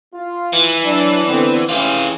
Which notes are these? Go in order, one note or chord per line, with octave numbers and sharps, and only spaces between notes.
F4
E3
F#3 D4
D3 B3 C4
C#3 E3 F4 G4